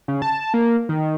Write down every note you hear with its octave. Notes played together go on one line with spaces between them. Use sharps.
C#3
A5
A#3
D#3